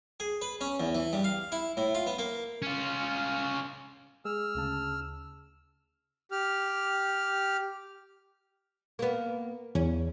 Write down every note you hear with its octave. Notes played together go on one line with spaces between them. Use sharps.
G#4
B4
C#4
E2
E3
G2
F5
E4
A2
F4
B3
A#3
C#4 F4
G#3 G#4 E6 F6
D2 C#3 A5
G4 F6
A#3 B3
E2 C#4